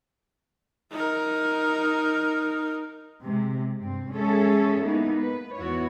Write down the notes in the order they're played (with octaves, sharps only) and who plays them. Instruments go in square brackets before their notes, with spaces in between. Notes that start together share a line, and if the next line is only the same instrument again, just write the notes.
[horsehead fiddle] D#4 A#4
[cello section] C3 G#3
G2 C4
G#3 C#4 G#4 A4 C#5 E5
G#3 A#3 B3 D#4 E4
B4
E2 B3 E4 F#4 C#5